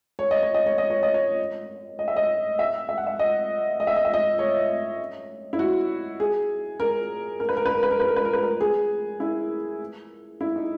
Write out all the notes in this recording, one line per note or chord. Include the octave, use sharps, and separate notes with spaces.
C#5
D#5
C#5
D#5
C#5
D#5
C#5
D#5
C#5
D#5
E5
D#5
E5
E5
F#5
E5
D#5
D#5
E5
D#5
E5
D#5
C#5
E4
F#4
G#4
A#4
A#4
B4
A#4
B4
A#4
B4
A#4
B4
A#4
B4
A#4
B4
A#4
G#4
E4
E4
D#4